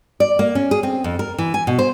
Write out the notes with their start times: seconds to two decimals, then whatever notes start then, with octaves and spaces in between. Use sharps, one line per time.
0.20 D5
0.39 A#3
0.55 C#4
0.71 G#4
0.83 C4
1.04 F2
1.19 A#4
1.38 E3
1.54 G#5
1.67 B2
1.79 C5